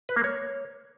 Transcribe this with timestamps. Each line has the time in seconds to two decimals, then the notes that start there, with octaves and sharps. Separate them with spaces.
0.09 B4
0.16 A#3
0.24 C#5